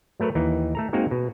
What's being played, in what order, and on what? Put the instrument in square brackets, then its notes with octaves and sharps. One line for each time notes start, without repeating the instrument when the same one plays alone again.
[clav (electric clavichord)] F#3 A3 A#4 B4 C#5
D#2 E3 D#4
A3 A4 A#5
G#3 A#3 C4 D#4 F#4 A#4
B2